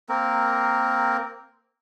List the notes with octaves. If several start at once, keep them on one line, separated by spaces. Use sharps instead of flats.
A#3 C4 A#4